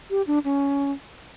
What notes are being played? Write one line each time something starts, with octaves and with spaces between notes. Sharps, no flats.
G4
D4
C#4